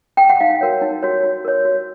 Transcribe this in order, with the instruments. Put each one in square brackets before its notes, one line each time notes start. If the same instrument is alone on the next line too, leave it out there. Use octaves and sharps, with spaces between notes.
[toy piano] G5
F#5
D#4 F5
F#4 A#4 C#5
D#4
F#4 A#4 C#5
F#4
A#4 C#5
F#4